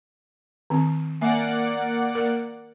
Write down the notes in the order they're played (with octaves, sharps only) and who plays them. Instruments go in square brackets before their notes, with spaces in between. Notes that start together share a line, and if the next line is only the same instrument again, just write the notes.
[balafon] D#3 C4
[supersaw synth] A#3 D5 F#5 [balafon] E5 G#5
[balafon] A#4